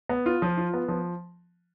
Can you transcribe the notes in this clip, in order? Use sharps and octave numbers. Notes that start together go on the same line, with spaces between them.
B3
F4
F3
F4
B3
F3